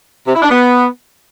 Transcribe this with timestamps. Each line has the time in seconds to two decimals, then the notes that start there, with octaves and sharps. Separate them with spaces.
0.27 C3
0.34 E4
0.42 D4
0.49 B3